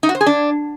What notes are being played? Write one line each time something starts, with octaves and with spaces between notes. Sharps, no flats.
D#4
F#4
C5
G#4
D4